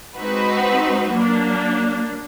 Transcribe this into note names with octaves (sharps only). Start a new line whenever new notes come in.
G#3 C4 D#4 F#4 B4
F#3 A#3 D4